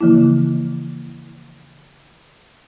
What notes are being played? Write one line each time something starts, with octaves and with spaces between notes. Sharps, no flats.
C#3 E3 F3 A#3 E4